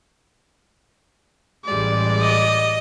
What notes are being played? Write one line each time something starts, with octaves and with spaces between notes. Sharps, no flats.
A1 G3 G#3 D5
D#5